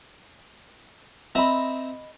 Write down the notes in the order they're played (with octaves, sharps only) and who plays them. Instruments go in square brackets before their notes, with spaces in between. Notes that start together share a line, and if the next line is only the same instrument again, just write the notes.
[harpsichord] C4 E5 A#5 [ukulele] D#5 B5